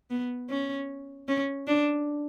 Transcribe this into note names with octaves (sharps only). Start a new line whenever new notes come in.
B3
C#4
C#4
D4